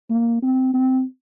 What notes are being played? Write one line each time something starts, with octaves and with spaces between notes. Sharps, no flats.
A#3
C4
C4